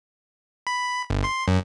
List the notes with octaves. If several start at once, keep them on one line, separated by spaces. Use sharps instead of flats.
B5
G1
C6
F#2